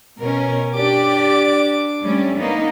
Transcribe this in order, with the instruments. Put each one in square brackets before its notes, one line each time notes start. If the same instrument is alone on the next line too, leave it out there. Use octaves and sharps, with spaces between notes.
[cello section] B2 C#4 [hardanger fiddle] A#4
[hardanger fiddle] D4 D6 [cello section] G4 D5
[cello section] G3 A3 C#4
A#3 B3 D#4